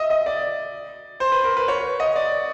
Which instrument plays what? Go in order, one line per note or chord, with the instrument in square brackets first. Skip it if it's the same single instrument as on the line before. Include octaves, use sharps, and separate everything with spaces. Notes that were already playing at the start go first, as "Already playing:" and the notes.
Already playing: [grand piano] D#5 E5
D#5
D5
C5
B4
A#4
B4
C#5
D#5
D5